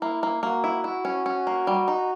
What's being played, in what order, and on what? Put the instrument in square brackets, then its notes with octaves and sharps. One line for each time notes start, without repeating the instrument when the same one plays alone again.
[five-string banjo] A#3 [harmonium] E4
[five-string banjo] A#3
[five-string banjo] A#3 [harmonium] F#4
[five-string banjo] E4
[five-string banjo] E4 [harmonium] F#4
[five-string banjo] C#4
C#4
A#3
G3
D#4